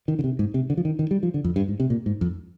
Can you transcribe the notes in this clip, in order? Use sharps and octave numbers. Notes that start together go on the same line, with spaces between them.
D#3
D3
C3
G#2
C3
D3
F3
D#3
D#3
G3
F3
D3
F2
G2
G#2
C3
A#2
G#2
F2